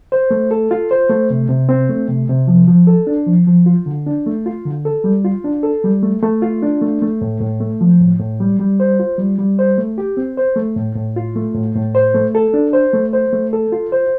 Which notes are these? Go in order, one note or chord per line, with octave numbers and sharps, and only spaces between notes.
C5
A3
A4
F4
C5
A3
C3
C3
C4
A3
C3
C3
F3
F3
A4
D4
F3
F3
F4
D3
D4
A3
F4
D3
A4
G3
F4
D4
A4
G3
A3
A3
F4
D4
A3
A3
A2
A2
A3
F3
A2
A2
G3
G3
C5
F4
G3
G3
C5
A3
G4
C4
C5
A3
A2
A2
F4
A3
A2
A2
C5
A3
A4
D4
C5
A3
C5
A3
A4
F4
C5